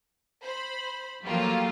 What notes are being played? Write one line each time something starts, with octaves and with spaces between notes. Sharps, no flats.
C5 B5
F3 F#3 A3 A#3 F4 G4